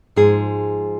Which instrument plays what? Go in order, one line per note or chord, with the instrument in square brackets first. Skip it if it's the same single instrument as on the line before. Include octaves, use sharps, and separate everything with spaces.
[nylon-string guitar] G#2 F3 G#4